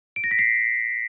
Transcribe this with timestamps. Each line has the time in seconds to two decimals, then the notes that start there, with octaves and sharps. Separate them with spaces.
0.16 D7
0.24 A#6
0.31 B6
0.39 C7